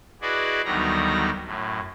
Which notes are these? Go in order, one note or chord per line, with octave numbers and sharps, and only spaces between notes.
E4 F#4 G#4 B4 D5 D#5
D2 D#3 F#3 G3 B3 A#5
F#2 A2